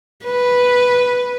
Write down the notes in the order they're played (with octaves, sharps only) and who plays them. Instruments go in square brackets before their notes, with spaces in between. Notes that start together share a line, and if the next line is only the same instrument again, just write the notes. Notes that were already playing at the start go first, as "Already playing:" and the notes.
[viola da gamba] B4